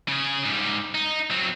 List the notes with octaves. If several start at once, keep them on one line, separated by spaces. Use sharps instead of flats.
C#3 G#4
G#2 G3
D#4
F#3 C4